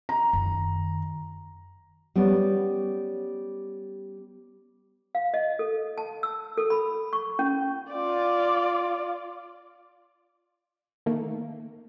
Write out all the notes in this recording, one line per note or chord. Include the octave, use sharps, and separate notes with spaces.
A#5
F#2 D#3
G3 B3 C#4
F5
D#5
A4
A5
E6
A4
B5
C#6
C#4
F4 D5
D#3 A3 A#3